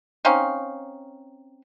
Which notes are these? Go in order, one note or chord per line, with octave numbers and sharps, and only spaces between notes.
C4 C#4 D#4 F5